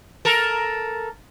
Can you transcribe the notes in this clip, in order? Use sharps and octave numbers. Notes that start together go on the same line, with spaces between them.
A4 A#4